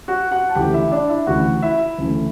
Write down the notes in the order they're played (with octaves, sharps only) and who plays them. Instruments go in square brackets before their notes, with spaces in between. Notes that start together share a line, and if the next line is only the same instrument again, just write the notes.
[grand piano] F#4 F#5
F#4 F#5
A5
D2 C#3 E3 A3 G4 G5
E4 E5
D4 D5
E4 E5
D2 C#3 E3 A3 F#4 F#5
E4 E5
D2 C#3 E3 A3